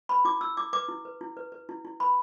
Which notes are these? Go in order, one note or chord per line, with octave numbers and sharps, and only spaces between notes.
B4 B5
E4 D6
E4 E6
E4 D6
B4 D6
E4
B4
E4
B4
B4
E4
E4
B4 B5